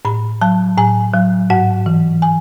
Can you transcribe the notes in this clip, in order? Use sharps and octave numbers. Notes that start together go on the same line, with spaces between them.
A2 B5
F#3 A5
A2 G#5
F#3
G#2 F#5
E3
G#5